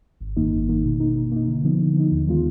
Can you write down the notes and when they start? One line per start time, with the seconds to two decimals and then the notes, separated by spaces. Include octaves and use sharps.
0.20 G#1
0.37 F#2 D#3 A#3 D#4
0.53 G#1
0.68 F#2 D#3 A#3 D#4
0.84 B2
1.00 A#3 D#4
1.16 B2
1.32 A#3 D#4
1.48 D3
1.64 F3 B3 D#4
1.80 D3
1.96 F3 B3 D#4
2.12 D#2
2.27 D#3 G#3 B3 F4